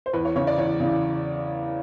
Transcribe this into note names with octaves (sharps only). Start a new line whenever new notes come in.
C5
E2 B4
C#5
C#3 E3 C#5
D5
E2 C#5
C#3 E3